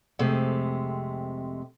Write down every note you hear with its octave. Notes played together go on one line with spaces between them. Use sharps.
F2 C3 G#3 A3